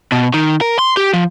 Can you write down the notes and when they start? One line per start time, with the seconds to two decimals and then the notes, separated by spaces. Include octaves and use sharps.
0.12 B2
0.34 D#3
0.61 A#4
0.79 C6
0.97 G4
1.14 F3